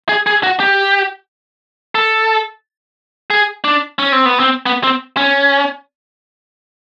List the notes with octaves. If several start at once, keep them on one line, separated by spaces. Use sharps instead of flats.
G#4
G#4
F#4
G4
A4
G#4
D4
C#4
C4
B3
C4
B3
C4
C#4